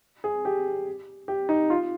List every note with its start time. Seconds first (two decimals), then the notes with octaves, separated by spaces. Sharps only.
0.24 G#4
0.45 G4
1.28 G4
1.49 D#4
1.70 F4